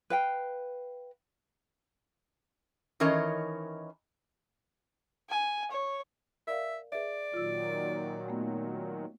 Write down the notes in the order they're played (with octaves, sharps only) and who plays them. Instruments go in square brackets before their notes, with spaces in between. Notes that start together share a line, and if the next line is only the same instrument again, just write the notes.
[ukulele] B4 F5 G5
[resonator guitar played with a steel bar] D#3 E3 C#4 A#4 C#5 D#5
[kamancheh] G#5
C#5
[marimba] A#4 D5 F5 [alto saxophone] E5
[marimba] G#4 B4 E5 [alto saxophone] D5
[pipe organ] A#2 D#3 F#3 [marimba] F4 E6
[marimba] A3 B3